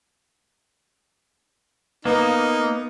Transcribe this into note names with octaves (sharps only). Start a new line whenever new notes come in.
A#3 B3 D#4